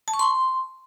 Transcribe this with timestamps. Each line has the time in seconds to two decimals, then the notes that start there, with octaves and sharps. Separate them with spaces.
0.08 A5
0.14 C#6
0.19 C6